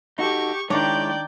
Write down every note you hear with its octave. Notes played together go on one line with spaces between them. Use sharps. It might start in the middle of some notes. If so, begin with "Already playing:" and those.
D#4 F#4 G4 A4 C#6
D#3 G#3 D4 E4 C#5 D5 G5